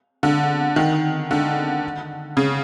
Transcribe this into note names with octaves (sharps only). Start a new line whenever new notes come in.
D3
D#3
D3
C#3